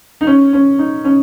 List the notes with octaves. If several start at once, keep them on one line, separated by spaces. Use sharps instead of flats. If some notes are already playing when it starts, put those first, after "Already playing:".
D#4
C#4
C#4
D#4
C#4